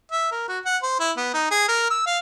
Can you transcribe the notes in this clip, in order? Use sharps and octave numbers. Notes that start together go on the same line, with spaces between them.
E5
A#4
F#4
F#5
C5
E4
B3
D#4
G#4
A#4
E6
F5